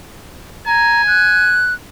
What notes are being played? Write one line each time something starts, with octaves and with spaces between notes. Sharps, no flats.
G#5 A#5
F#6